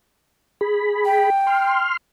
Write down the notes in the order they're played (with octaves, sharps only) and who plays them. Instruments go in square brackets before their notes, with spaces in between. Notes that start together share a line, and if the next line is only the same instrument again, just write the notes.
[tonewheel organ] G#4 B5
[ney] G5
[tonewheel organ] C6 F6